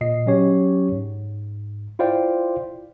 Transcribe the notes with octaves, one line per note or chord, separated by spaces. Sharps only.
A#2 D#5 C7
F#3 C#4 G4 C#5
G#2
E4 F4 C5 D5 F5 G5